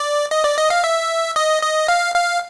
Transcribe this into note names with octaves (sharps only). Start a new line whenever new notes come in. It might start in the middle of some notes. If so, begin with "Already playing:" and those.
Already playing: D5
D#5
D5
D#5
F5
E5
D#5
D#5
F5
F5